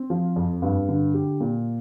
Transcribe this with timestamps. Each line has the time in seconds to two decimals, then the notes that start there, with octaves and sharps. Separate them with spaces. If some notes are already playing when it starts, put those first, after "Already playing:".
Already playing: C4
0.10 F3
0.36 F2
0.62 G2
0.88 D3
1.14 G4
1.41 A#2